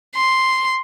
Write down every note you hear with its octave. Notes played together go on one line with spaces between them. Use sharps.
C6